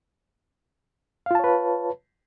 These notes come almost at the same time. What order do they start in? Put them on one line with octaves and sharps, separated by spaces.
F5 F4 A5 C#5 B4